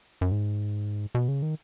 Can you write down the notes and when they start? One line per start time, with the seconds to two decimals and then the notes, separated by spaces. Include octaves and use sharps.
0.21 F#2
0.32 G#2
1.15 B2
1.28 C#3
1.42 D#3